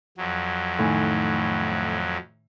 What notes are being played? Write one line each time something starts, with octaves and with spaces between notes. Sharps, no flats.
F2 F#3
A2 D#3 G#5